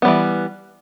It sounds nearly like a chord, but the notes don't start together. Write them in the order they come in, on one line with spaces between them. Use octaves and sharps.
B3 G3 E3